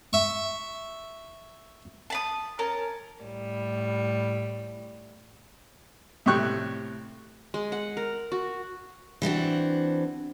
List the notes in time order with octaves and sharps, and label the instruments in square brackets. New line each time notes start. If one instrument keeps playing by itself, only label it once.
[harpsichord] E5 C#6
[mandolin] A5 B5 D#6
C#4 A#4 A5
[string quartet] A2 G3
[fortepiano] A2 C3 G4 C#6 F#6
[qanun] G#3
F#5
A#4
F#4
[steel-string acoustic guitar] E3 C4 D4 F#4